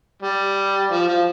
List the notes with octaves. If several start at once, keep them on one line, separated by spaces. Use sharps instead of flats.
G3
F3
F3